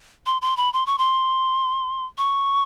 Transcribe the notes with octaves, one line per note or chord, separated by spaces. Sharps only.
C6
C6
B5
C6
C#6
C6
C#6